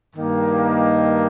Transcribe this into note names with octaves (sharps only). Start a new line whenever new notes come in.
G2 D#3 A#3 D#4